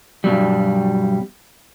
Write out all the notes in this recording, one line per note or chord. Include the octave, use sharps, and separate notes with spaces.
G2 B2 F#3 G3